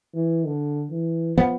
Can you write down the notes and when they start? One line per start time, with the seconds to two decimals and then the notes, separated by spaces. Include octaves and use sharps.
0.15 E3
0.45 D3
0.91 E3
1.38 F3 B3